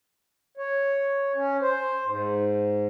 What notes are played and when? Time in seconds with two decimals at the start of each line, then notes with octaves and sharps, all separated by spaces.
0.57 C#5
1.35 C#4
1.61 C5
2.05 G#2